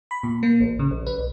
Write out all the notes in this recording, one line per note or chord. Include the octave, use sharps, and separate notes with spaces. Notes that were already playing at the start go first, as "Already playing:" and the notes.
B5
A#2
A#3
A1
C#3
A#1
B4
B1